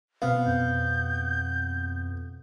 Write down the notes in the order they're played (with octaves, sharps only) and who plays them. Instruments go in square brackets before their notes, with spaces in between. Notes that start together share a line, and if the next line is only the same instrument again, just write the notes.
[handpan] B2 C4 F5 [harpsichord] B3
[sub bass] F2 [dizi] G6